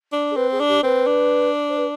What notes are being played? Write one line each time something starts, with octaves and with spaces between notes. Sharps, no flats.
D4
G#4
C4 B4
G#4
D4
G4
C4 B4
D4
C5
B4